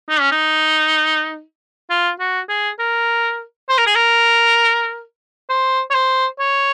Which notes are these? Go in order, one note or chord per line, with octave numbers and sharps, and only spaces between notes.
D#4
C#4
D#4
F4
F#4
G#4
A#4
C5
A#4
G#4
A#4
C5
C#5
C5
C#5